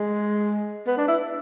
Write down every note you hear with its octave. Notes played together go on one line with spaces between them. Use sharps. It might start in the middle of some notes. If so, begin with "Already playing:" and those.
Already playing: G#3
B3
D4
E4